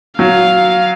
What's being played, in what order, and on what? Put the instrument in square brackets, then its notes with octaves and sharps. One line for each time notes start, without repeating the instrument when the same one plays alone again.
[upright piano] F#3 [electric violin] F5